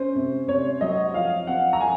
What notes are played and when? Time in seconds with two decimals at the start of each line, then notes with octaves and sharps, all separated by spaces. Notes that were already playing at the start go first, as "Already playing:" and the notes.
Already playing: C#4 C5
0.15 C3
0.48 C3 C#5
0.81 F#3 D#5
1.14 F3 F5
1.47 C4 F#5
1.73 A#5
1.79 F3 G#5